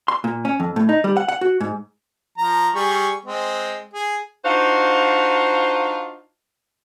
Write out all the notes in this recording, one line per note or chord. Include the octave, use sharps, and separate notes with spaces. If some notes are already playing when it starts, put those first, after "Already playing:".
C6
A#2
C#4
F2
A2
D#4
G3
F#5
F#5
F#4
G#2
F3 A#5
G3 G#4 C#6
G#3 C4
G#4
D4 D#4 F4 F#4 C5 F5